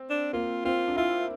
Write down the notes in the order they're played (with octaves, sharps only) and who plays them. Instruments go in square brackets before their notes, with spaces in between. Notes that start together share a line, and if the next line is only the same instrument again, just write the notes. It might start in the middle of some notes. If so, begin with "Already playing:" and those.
Already playing: [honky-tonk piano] C4
[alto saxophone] D4
[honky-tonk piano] A#3 [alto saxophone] F4
[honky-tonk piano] C4 [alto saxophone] F4
[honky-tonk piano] D4
[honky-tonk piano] E4 [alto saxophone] F4